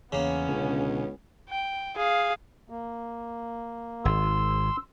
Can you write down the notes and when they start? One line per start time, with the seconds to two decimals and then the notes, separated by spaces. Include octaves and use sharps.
0.12 E2 C#3 A#3 B3 C#4
0.48 C#2 B2 D3
1.49 G5
1.96 G#4 F5
2.70 A#3
4.05 G#1 C6 E6